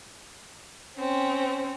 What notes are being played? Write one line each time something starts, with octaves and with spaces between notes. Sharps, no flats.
C4 C#4